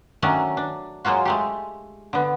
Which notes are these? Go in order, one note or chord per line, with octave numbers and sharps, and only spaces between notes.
D#3 F#3 A3 C#4 D4
D4
F#3 G#3 A#3 F4 F#4
G#3 A3 G4
D3 B3